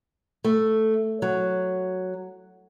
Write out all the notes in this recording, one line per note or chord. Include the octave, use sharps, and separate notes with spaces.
A3
F#3